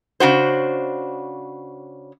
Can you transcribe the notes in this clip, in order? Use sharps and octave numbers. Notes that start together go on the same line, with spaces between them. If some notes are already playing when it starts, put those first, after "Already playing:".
C#3 D4 F#4 C5